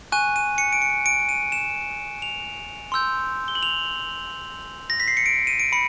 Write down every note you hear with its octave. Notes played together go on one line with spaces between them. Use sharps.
G#5 C#6 F#6 D#7
D#7
C#7
D7
C#7
D7
D#7
E7
F7
C6 E6 G6
G7
F#7
F7
A#6
B6
C7
C#7
D7
D#7
D7
B5 C#7